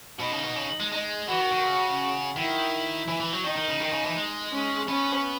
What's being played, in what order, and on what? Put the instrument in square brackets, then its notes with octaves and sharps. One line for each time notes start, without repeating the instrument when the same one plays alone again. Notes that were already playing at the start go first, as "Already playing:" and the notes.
[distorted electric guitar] B2 [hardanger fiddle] D#4
[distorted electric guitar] C#3
B2
C#3
G#3
G#3
[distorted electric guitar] E3 [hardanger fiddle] F#4
[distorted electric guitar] D#3
D#3
C#3
[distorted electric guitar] D#3 [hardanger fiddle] E4
[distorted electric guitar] E3
E3
F#3
[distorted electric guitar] D#3 [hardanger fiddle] D#4
[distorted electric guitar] D#3
C#3
D#3
C#3
E3
G#3
[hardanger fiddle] C#4
[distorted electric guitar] B3 [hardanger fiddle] C#4